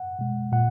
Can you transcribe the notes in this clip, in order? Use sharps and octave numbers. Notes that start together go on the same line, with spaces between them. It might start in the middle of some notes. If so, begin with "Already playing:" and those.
Already playing: F#5
B2 G#3
A#2 F#5